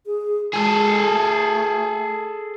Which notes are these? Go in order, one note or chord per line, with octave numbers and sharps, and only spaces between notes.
G#4
G#3 G#4 A4
A3